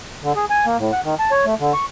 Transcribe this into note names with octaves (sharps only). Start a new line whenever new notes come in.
D3
G#4
G#5
A#3
A2
F#5
D#3
A5
C#5
A3
D3
C#6